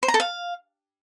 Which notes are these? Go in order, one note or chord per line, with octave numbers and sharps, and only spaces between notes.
C5
A#5
A4
F5